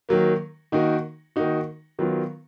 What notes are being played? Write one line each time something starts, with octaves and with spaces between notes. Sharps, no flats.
D#3 F#3 A#3
D#3 A#3 D#4 F#4
D#3 A#3 D#4 F#4
D#3 F#3 B3 F4